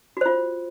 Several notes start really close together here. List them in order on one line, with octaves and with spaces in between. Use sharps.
F#4 C5 F4